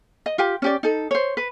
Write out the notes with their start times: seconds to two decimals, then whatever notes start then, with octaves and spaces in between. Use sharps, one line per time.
0.26 D#5
0.38 F4 G4 G5
0.62 C#4 G4 D5
0.83 D#4 A4
1.11 C5 C#5
1.37 B4